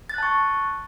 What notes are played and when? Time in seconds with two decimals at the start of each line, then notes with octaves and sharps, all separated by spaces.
0.10 A6
0.14 F#6
0.18 A5
0.23 C#6